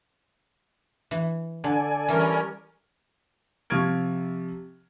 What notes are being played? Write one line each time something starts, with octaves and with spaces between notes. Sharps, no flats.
E3
D3 A4 D5 G#5
E3 G3 C#4 A#4
C3 F3 C#6 F6 G#6 D7